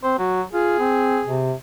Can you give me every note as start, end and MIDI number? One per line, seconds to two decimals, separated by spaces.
0.03 0.17 60
0.03 0.17 72
0.19 0.43 54
0.19 0.41 66
0.53 0.76 65
0.53 1.50 68
0.79 1.21 60
1.27 1.54 48